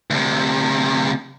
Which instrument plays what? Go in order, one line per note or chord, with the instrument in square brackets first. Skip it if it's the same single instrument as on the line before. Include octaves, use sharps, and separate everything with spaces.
[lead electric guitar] D2 C3